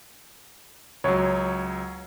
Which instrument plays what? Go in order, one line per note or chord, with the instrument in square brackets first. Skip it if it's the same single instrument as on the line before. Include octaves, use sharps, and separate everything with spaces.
[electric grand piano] C#2 F#3 [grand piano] C#5